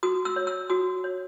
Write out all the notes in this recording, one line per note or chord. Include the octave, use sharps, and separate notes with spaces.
F#4 D#6
E6
C#5
E6
F#4 D#6
C#5